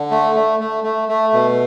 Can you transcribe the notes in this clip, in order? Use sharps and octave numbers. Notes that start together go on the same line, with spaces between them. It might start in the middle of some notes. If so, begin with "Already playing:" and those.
Already playing: D3
A3
A3
A3
A3
A3
B2